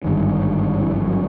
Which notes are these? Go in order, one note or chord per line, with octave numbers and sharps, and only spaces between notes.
G#1 G2 D3 D#3
E3
F3
F#3